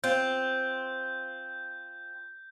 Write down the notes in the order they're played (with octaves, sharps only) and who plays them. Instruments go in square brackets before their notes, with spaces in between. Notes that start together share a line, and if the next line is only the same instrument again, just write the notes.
[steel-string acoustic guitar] C4 F4 [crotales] G6